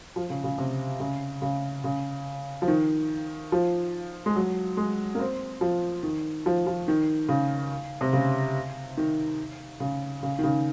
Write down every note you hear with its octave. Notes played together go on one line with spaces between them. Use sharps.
F3
C#3
C#3
C3
C#3
C#3
C#3
F3
D#3
F3
G#3
F#3
G#3
A#3
C4
F3
D#3
F3
F3
D#3
C#3
C3
C#3
D#3
C#3
C#3
D#3
C#3